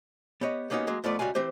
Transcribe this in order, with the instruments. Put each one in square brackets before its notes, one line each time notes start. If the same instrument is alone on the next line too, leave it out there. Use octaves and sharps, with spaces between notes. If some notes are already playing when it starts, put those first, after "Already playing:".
[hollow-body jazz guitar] B3 G4 C#5 D#5
G3 A#3 B3 C#4 D#4 F#4
F#3 G#3 A#3
F2 A3 B3 F4 D5
C#2 G3 F#4 F5 G#5
E3 C4 G4 C5